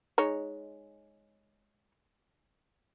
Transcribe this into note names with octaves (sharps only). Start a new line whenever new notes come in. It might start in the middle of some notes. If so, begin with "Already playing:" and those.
G#3 D#4 C#5